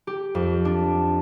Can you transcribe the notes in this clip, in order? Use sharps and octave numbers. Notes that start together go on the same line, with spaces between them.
G4
F2
D4